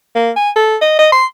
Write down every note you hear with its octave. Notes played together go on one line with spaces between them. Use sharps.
A#3
G#5
A4
D#5
D#5
C6